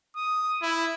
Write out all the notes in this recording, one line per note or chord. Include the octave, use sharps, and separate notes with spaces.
D#6
E4